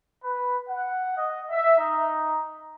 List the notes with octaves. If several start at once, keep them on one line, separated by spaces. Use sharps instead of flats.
B4
F#5
D#5
E5
D#4